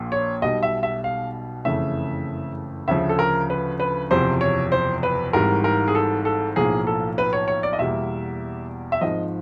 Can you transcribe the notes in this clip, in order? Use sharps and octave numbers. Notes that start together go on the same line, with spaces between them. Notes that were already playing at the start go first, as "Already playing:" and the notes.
Already playing: A#1 A#2 F3
C#5
B1 B2 G3 D#5
E5
E5
F5
F#1 F2 C#3 E3 A3 E5
D2 C#3 F3 E5
A4
A#4
B4
B4
F#1 E2 C3 F3 C5
C#5
C5
B4
G#1 G#2 E3 G3 A#4
A#4
G#4
A4
A4
B1 A2 F3 A#3 G#4
A4
B4
C#5
C#5
D5
D#5
E2 B2 G3 A#3 E5
E5
G#1 G#2 F3 D#5